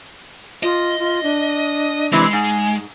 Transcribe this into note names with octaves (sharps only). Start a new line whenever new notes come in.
F4 D#5
F4
D4
C3 E3 G#3 E4
G#2 G#5